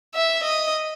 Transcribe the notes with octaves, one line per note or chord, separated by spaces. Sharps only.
E5
D#5